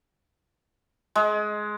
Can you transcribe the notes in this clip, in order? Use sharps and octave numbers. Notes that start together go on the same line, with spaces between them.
G#3